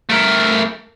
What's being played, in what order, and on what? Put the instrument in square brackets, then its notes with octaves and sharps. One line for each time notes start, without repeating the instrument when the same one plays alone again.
[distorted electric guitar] A3 A#4